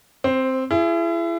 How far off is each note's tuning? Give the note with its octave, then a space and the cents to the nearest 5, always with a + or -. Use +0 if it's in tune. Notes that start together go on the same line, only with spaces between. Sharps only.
C4 +0 C5 +35
E4 +35 G#4 +10